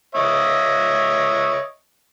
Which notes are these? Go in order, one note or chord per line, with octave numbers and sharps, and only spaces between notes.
C#5 D#5 E5